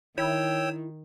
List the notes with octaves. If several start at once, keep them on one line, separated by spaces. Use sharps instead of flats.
D#3 E4 C#5 G5 E6